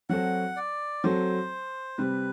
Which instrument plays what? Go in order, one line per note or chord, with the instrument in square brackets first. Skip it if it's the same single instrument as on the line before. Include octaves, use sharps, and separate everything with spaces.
[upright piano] F#3 C4 F#4 A4 [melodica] F#5
[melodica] D5
[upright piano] F#3 C4 F#4 A4 [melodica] C5
[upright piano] C3 G3 C4 [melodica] B4